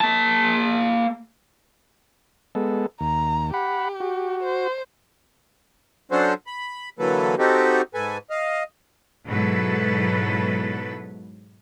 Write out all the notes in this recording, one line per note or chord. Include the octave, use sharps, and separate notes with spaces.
A#3 A5
G#3 B3 A4
D#2 A#5
G4 F#5 B5
F#4
C5
F#3 C#4 D4 F#4 A4 C5
B5
D3 E3 F#3 A#3 A4 B4
C4 D#4 F#4 G4 A4
G#2 A4 B4 G#5
D#5 F5
G#2 B2 F#3 E4 A4 B4